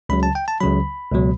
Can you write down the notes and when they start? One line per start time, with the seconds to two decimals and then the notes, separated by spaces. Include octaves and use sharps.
0.09 C#2 C#3 F#3 B5
0.23 A5
0.35 G5
0.48 A5
0.60 C#2 C#3 F#3 B5
1.12 C#2 B2 F#3